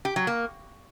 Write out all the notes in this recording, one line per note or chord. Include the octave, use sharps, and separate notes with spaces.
G4
F#3
A#3